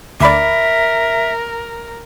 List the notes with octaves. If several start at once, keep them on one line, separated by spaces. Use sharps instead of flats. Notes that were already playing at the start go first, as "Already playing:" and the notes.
D2 A#4 D5 E5 B5 D6